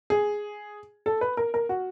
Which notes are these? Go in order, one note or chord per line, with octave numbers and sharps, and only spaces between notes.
G#4
A4
B4
A#4
A#4
F#4